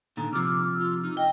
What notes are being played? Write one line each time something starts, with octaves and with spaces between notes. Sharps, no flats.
A#2 D3 D#3
C3 F3 D6 E6 F6
F4
D#4
D#5 G5